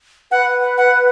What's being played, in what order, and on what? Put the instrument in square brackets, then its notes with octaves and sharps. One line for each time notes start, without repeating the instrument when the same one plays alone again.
[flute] B4 [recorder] F#5
[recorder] F#5